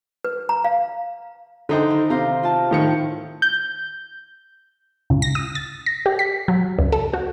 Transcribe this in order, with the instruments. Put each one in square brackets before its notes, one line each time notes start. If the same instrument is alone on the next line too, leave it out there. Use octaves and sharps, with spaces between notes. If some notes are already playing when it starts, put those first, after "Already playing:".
[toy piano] B4
A#5
F5
[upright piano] D3 D#4 [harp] E4 C5 G5
[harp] D#3
[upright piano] C3 [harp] C5 F5 A#5
[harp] F4 A5 F6
[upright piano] A2 D#3 C#7
[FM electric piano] G6
[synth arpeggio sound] C#2
A#6
D#6
A6
A#6
G4
B6
F#3
C#2
A4
F#4